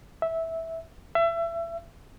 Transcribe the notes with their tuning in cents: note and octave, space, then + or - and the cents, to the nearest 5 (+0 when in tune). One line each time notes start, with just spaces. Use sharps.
E5 -10
E5 +30